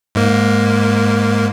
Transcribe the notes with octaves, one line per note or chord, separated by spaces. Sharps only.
G#2 A#3